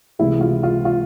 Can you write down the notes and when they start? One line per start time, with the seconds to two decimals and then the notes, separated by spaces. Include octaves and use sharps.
0.19 C#2 C3 E3 E4
0.41 F4
0.63 F4
0.85 F4